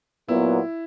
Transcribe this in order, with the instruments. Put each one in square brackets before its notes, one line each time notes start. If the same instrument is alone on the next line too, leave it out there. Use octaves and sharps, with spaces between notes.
[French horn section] A#2 F#3 B3 [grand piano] E4